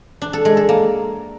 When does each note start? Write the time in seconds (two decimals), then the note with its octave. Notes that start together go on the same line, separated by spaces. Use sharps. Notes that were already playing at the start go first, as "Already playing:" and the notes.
0.22 D4
0.33 A4
0.45 G#3
0.57 A4
0.69 A#3